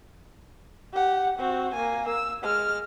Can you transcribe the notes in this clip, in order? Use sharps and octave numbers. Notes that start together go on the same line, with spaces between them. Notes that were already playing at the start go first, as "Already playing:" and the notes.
G4 F#5
C4 F#4
A#3 G#5
E6
G#3 F6